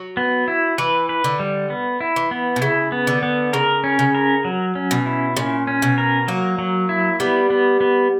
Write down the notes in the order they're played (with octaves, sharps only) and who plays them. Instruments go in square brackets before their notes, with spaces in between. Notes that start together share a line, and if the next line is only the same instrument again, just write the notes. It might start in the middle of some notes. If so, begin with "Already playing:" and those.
Already playing: [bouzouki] F#3
[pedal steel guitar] B3
E4
[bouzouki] E3 [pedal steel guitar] B4
[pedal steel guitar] B4
[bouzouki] D3
[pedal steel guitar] G3
B3
E4
[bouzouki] E3
[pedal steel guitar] B3
[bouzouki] B2
[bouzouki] C#3 [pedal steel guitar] E4
[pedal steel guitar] B3
[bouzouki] D3
[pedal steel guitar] B3
[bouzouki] C#3 [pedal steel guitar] A#4
[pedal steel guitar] C#4
[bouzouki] C#3
[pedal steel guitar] A#4
F#3
C#4
[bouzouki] B2
[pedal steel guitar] E4
[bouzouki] A#2 [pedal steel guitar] C#4
[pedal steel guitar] C#4
[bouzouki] B2
[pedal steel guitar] A#4
[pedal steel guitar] F#3 [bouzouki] A#3
[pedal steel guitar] F#3
E4
[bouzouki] G3 [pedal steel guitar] B3
[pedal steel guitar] B3
B3